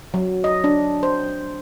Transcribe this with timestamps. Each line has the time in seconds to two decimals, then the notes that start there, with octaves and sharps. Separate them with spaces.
0.14 F#3
0.44 D#5
0.64 D4
1.03 C5